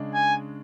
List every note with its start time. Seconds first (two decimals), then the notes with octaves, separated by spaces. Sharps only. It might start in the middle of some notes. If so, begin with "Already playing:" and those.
Already playing: C#3 G#3 D4
0.13 G#5